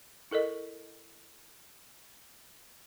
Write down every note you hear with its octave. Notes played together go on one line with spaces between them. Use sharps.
E4 A4 A#4 D#5